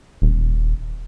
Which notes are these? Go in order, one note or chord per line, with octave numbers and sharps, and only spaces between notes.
D#1